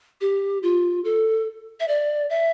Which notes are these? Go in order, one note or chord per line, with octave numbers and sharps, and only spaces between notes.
G4
F4
A4
E5
D5
E5